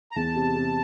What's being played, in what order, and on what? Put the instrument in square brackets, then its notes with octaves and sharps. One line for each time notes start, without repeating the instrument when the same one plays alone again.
[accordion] A#5
[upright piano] E2 [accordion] A5
[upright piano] C3
C3